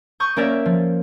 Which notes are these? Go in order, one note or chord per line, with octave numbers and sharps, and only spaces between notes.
C#6 D#6 G6
A#3 C#4 A#4 D5 E5
F3